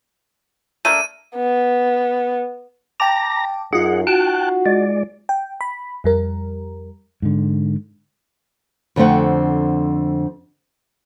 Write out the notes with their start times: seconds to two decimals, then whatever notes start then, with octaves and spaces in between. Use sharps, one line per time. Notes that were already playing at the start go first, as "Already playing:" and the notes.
0.85 A3 A#3 D4 D#7
1.36 B3
3.00 G5 A5 A#5 D6 A#6
3.73 F#2 D#4 F4 G#4 F#5
4.07 F#4 G5 A5 F#6
4.66 G#3 D5
5.29 G5
5.61 B5
6.04 F2 G3 A#4
7.22 G#2 D3
8.96 F2 D3 A3 C4 F#5